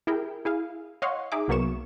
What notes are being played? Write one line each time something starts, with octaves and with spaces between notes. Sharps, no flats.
E4 G4 G#4 A#4 G5
E4 G#4 F5
C#5 D#5 F5 F#5 C6 C#6
D#4 G#4 E5 D6
C2 F#3 A#3 B3 C#6 E7